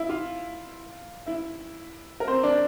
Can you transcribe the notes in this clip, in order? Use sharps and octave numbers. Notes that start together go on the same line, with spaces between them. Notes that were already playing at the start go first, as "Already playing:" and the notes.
Already playing: E4 E5
F4 F5
E4 E5
A#4
C4 C5
D4 D5